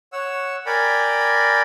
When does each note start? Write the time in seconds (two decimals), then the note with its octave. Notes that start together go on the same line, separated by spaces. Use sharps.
0.13 C#5 F#5 E6
0.66 A#4 D5 G5 G#5 B5